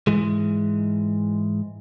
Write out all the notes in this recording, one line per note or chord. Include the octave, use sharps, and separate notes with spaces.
G#2 E3 G#3